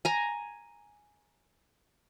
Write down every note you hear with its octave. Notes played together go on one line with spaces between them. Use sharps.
G#5 A#5